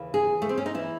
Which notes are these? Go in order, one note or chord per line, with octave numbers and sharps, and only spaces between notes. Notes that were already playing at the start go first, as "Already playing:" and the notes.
Already playing: D#2 C#3 E3
G#4
A3
C4
C#4
D#4
E3 E4